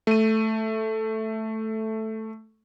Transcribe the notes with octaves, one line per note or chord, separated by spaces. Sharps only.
A3 D#7